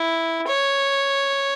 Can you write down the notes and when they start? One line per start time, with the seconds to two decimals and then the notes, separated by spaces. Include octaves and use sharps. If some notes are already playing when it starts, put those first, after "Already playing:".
Already playing: E4
0.47 C#5